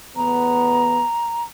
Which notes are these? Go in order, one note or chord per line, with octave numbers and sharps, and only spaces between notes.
E2 A2 B3 A#5